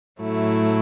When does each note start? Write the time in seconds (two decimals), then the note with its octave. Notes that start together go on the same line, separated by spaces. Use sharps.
0.20 A2 F#3 A3 E4